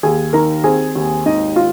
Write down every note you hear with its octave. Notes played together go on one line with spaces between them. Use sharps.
D#2 G#4 G#5
D#3 A#4 A#5
C4 G#4 G#5
D#2
G#1 D#4 D#5
F4 F5